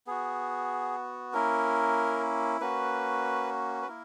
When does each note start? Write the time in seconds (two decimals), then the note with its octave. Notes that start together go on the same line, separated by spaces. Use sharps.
0.07 B3 F#4 G#4
1.33 A#3 C#4 E4 A#4
2.61 A#3 C#4 F#4 B4
3.82 B4
3.88 A#3 E4 A#4